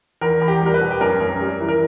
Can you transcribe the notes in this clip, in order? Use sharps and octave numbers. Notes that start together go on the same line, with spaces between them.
E2 A#4
E2
G4
G3 A#4
B4
B2
G4
F#2 A#4
F#2
G3
E3
A#4